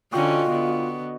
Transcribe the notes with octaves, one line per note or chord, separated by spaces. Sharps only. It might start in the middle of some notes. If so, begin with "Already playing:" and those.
D3 C#4 F4 F#4 D#5 G5
D3 B3